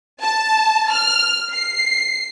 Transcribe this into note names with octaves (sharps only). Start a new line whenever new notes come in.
A5
F6
C7